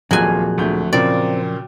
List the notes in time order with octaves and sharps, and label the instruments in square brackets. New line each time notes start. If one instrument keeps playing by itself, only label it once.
[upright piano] D#1 F4 F#6 [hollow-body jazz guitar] F2 [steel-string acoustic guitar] A#2 G#4 [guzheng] F#3 G#5
[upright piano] D2 A3 G6
[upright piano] A#2 C#3 A#3 [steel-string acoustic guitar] C4 [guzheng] D5